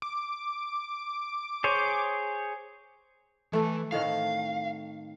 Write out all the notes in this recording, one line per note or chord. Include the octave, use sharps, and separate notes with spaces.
D6
G#4 C5 C#5
E3 A3 A4
A2 D#3 C4 F5